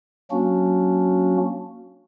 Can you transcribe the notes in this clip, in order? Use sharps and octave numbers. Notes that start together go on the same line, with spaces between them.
F#3 A#3 C#4 D4 F#4